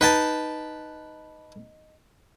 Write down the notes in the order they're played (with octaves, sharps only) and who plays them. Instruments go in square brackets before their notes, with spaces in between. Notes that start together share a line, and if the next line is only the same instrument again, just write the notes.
[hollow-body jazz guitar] D#4 [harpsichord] B4 G5 A5